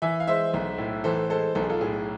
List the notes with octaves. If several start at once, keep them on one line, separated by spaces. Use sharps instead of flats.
E3 E5 G#5
F5
G#3 C5 E5
B1
A2
E3 A4 C5
G#3 A4 C5
B1 A4
G#4
F4 A4
A2 G#4